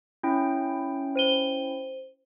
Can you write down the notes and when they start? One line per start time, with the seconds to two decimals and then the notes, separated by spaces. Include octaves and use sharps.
0.23 C#4 E4 G5
1.16 C5 D#7 G7